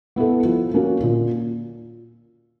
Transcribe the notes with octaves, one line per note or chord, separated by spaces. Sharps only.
B3 E4 A4
F3
A#3 C#4 F#4 A#4
A#2